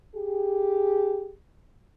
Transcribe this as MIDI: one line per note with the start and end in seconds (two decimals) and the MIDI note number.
0.16 1.34 67
0.16 1.34 68